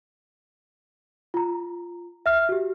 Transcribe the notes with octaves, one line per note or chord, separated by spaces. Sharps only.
F4 A#5
E5 F6
F#4 G4